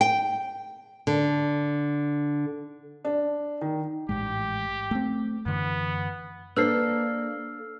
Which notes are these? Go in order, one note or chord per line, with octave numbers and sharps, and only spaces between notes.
G5
D3
D4
D#3
A1 G#2 G#3 G4
A3 C4
F#2 D3 E3 B3
A#3 D4 A4 B4 C5 E6 F6 C7